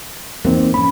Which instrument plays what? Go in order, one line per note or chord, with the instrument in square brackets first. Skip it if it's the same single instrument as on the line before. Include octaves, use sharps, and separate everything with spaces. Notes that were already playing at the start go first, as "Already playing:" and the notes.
[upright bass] E2 [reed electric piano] A#3 C4 D#4
[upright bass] G2 F3 [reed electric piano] C#4 B5